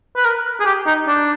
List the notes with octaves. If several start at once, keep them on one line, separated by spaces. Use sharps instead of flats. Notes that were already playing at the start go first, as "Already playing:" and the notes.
B4
A#4
G#4
G4
D#4
D4